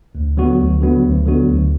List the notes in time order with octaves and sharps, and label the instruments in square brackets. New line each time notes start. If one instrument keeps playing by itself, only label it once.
[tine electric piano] D2
D3 F#3 B3 F#4
D2
D3 F#3 B3 F#4
D2
D3 F#3 B3 F#4
D2